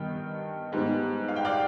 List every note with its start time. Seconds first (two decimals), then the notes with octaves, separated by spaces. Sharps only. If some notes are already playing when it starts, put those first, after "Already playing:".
Already playing: G2 D#3 B3 D#5 G5
0.72 G#2 G3 B3
1.28 F5
1.36 G5
1.45 D5 F5